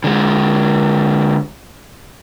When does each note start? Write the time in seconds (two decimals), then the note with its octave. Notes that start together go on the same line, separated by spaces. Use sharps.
0.04 D3 G#3